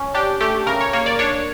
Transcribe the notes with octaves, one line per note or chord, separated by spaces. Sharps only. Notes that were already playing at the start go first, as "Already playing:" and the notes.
Already playing: C#4
D4 G4
A3 G4
C#3 A#4
C#5
A#3 C#5
D5
D4 C#5